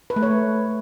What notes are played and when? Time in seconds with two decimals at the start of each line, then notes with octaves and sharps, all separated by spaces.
0.10 B4
0.16 A3
0.23 C#5